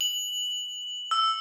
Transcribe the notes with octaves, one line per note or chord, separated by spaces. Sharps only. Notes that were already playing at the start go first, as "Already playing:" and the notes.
F#7
E6